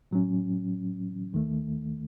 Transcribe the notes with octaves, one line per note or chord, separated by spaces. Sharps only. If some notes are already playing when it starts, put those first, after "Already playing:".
A2 F#3 C#4
D#2 D#3 A3